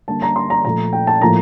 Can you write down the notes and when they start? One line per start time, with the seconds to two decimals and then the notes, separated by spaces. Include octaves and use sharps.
0.08 D3 G3 A#3 A5
0.22 A#5
0.36 C6
0.50 A#5
0.65 A#2 F3 A3 A#5
0.93 G5
1.07 A5
1.21 A2 F3 A#3 A#5